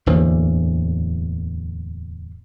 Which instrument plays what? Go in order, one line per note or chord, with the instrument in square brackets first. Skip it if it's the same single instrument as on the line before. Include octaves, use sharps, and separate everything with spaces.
[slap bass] D1 E2 D3 A#3